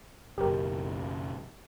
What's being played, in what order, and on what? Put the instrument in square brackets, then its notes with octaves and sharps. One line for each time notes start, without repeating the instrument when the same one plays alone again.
[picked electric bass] F#1 B1 [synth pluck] G4 A#4